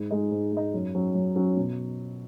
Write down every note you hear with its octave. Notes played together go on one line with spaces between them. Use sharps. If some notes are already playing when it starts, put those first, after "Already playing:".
Already playing: G#2
G#3 D#4
G#2
G#3 D#4
F#2
F#3 C#4
F#2
F#3 C#4
B2